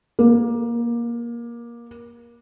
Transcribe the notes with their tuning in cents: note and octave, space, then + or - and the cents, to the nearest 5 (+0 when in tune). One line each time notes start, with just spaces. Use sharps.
A#3 +20